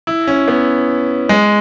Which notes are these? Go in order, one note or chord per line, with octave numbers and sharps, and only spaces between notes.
E4
C#4
B3
G#3